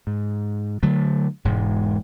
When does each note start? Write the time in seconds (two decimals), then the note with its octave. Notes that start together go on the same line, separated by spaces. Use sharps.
0.07 G#2
0.83 D3 F#3 A3
1.45 E1 G#2 G#3